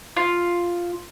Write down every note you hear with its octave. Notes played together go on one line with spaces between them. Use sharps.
F4